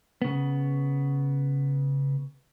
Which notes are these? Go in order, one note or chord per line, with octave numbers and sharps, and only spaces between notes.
C#3 B3